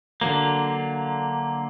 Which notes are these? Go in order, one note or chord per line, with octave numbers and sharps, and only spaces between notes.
D3 F#3 A#3